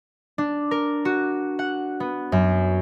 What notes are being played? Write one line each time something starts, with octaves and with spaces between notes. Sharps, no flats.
D4
A#4
F#4
F#5
B3
F#2